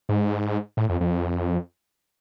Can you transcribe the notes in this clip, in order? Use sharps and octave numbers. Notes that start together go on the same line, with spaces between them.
G#2
A2
F2
F2